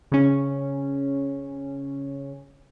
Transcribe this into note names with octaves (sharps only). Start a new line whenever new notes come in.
C#3 C#4